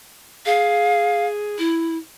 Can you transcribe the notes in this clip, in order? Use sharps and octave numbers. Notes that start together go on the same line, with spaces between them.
G#4 F5
E4